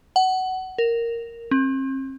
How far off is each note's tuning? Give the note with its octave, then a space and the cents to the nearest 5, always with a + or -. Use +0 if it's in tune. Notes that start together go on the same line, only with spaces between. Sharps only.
F#5 +20
A#4 -5
C4 +40